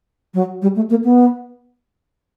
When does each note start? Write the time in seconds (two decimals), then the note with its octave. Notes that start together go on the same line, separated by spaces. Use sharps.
0.34 F#3
0.62 G3
0.76 A3
0.90 A#3
1.04 B3